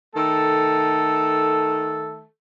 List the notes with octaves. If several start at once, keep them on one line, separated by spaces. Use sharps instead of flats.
D#3 A3 A4